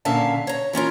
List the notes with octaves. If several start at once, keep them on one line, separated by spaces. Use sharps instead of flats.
A#2 D3 C#4 E5 F5 A5
C#5 A#5
E3 C#4 F4 A#4